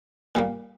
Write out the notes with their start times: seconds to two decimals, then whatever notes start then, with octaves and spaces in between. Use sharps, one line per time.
0.35 A#2 G3 A#3